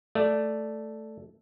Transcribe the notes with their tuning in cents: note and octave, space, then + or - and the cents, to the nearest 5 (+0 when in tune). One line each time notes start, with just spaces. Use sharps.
A3 +0 D5 +0